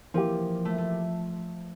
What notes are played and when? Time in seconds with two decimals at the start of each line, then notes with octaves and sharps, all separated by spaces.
0.14 E3 F3 A#3 E4 G4
0.65 A3
0.78 A3